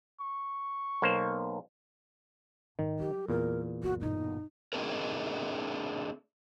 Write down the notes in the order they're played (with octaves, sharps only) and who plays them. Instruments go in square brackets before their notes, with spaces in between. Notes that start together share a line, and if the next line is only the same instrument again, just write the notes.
[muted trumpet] C#6
[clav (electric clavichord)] B1 A#3 C5
[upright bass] G#2 [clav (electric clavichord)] D#3
[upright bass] F#3 G3 [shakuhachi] G4
[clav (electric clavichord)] E2 A#2 [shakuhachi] A#4
[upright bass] C2 F#2 [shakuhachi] F#4
[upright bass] G1 B2 [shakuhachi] D#4
[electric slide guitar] A3 C4 D4 G#4 A#4